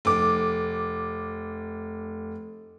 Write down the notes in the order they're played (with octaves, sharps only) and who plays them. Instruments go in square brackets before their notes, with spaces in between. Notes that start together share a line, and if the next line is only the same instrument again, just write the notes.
[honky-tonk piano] F1 D6